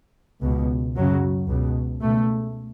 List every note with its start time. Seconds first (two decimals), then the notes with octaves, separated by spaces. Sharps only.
0.41 C#2 B2
0.96 F#2 C#3 F#3
1.48 C#2 B2
2.02 C#2 B2 A3